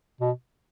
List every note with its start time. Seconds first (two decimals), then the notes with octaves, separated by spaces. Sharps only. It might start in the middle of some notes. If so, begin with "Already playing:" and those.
0.21 B2